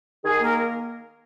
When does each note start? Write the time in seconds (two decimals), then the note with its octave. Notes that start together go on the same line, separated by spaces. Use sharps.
0.25 D#3 G#4
0.40 A#3 A#4